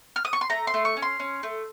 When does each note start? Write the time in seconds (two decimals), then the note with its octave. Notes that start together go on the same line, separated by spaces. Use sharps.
0.16 F6
0.25 D#6
0.33 C#6
0.41 C6
0.50 A3 A#5
0.67 C6
0.74 A3
0.85 C#6
0.97 C#4
1.02 C6
1.20 C#4
1.43 A3